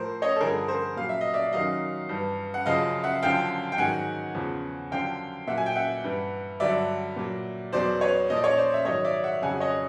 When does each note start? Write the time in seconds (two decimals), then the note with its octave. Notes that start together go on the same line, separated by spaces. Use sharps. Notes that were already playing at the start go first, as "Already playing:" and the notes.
Already playing: A2 F3 A#4 C5
0.22 C#5 D#5
0.36 A4
0.40 G2 D3 F3 G#4 A#4
0.68 A#4 C5
0.96 A#2 F#3 F5
1.09 E5
1.21 D#5
1.34 D5 E5
1.53 F#2 D#3 F#3 D#5 F5
2.09 G2 E3
2.54 F#5
2.66 F#2 C#3 F3 D#5 F5
3.03 E5 F#5
3.22 F#2 D3 F3 F5 G5
3.72 G5
3.78 G#2 D#3 F#3 F#5 G#5
4.35 E2 C#3 F3
4.91 F#2 D3 F3 F5 G5
5.47 A#2 F#3 E5 F#5
5.58 G#5
5.66 G5
5.76 E5 F#5
6.04 G2 E3
6.60 G2 D3 F#3 D5 E5
7.16 A#2 F#3
7.73 E2 B2 F#3 C5 D5
8.01 B4 C#5
8.30 A#2 F3 D#5
8.36 D5
8.44 C#5 D#5
8.57 C5 D5
8.74 E5
8.85 G#2 D#3 F#3 C#5 D#5
9.04 D5 E5
9.24 E5 F#5
9.42 F2 C#3 F#3 F#5 G#5
9.60 C#5 D#5